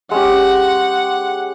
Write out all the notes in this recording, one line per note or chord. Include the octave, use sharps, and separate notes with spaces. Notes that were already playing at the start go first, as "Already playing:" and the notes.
G#3 C#4 G4 F#5